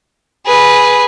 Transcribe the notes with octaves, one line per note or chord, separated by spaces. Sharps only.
G#4 B4